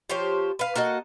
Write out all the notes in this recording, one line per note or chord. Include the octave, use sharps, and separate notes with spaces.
F3 G4 C5 C#5
B4 F5
A#3 F#4 A4 D#5